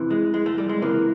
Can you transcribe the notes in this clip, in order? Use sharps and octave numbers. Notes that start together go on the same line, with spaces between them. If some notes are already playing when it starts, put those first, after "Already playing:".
Already playing: F2 C3 E3
G#3
G#3
A3
G3
G#3
C#2 C3 E3 A#3